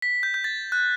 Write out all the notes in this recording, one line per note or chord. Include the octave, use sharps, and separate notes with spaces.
B6
G6
G6
A6
F#6